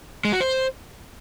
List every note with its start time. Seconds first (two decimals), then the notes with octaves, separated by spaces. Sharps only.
0.25 G#3
0.33 F#4
0.40 C5